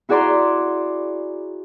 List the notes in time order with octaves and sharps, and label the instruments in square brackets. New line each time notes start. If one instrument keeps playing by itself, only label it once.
[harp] E4 F#4 G#4 D5 A#5 C6